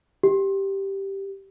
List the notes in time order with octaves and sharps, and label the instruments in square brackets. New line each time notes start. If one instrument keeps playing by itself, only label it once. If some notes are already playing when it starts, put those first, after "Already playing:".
[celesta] G4